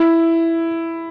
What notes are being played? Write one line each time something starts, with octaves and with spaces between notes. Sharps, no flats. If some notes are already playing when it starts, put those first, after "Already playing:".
Already playing: E4